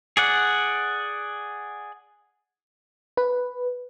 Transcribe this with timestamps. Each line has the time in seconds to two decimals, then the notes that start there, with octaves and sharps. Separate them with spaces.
0.17 G#4 D5 F#5
3.17 B4